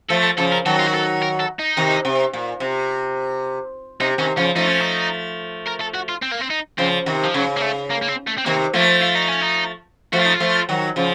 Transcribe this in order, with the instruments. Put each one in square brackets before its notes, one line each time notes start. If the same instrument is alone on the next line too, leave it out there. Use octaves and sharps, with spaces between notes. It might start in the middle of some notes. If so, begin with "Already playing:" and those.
[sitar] F3 A3 [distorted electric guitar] A4
[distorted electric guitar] A4
[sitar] C#3 F3 [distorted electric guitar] A4
[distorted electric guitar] A#4
[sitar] D#3 F#3 [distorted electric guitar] A4
[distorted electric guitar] F4
F#4
A4
A#4
A4
D#4
[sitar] C3 D#3
C3
A#2
C3
[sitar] C3 [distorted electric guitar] D#4
[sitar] C3 D#3 [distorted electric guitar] C#4
[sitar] C#3 F3 [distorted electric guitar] C#4
[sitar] F3 A3 [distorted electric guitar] D#4
[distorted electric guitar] C#4
D#4
A#4
A4
F#4
F4
C4
A#3
C4
D#4
[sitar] C#3 F3 [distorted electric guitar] C4
[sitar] C3 D#3
[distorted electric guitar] F3
[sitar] C#3 [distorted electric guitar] F#3
[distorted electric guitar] A#3
A3
A#3
A#3
C4
A3
C4
[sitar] C3 D#3 [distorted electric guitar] A#3
[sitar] F3 A3 [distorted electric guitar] A#3
[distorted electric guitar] F4
D#4
C#4
D#4
[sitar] F3 A3 [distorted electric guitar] F#4
[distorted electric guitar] F4
D#4
F4
[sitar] F3 A3
D#3 F#3
C#3 F3